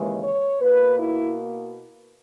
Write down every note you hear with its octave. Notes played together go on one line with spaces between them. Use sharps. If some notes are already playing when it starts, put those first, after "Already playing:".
Already playing: D#2 C#3 E3 G#3
C#5
B2 A#3 B4
E4